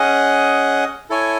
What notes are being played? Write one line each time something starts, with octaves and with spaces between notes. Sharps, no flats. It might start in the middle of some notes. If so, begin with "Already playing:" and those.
Already playing: C#4 G#4 D#5 F#5
E4 A4 C#5 G#5